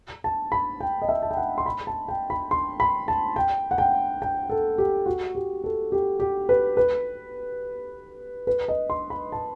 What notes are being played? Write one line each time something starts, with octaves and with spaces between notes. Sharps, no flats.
A5
B5
G5
D#5
E5
A5
G5
F#5
C6
B5
A5
G5
B5
C6
B5
A5
G5
F#5
G5
G5
A4
G4
F#4
G4
A4
G4
G4
B4
B4
B4
D#5
C6
B5
A5